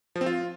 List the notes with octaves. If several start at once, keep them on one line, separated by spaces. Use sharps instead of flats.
F3
C4
F4